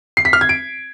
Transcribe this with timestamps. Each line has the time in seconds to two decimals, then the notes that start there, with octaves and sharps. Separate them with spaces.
0.17 C7
0.25 B6
0.33 F6
0.41 G#6
0.49 D7